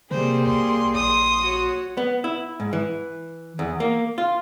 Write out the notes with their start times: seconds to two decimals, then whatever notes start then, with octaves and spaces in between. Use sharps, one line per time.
0.11 C3 G3 A#3 G#4 C5
0.46 C2 C6
0.95 A#1 C6 D#6
1.41 F#4 C#5
1.97 B3
2.24 E4
2.60 G#2
2.73 E3
3.59 E2
3.80 A#3
4.18 F4